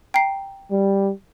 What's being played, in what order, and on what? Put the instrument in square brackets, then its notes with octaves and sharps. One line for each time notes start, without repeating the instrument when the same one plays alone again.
[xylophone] G5 A#5 C7
[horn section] G3